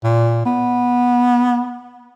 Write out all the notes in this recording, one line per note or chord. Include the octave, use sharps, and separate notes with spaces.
A#2
B3